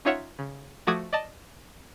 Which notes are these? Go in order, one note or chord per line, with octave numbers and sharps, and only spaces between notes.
C#4 D#4 F4 C#5 E5 F#5
C#3
F3 A3 F#4 D6 D#6 G#6
D5 D#5 A5